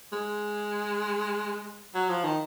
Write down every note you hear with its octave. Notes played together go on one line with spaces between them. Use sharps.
G#3
F#3
F3
D#3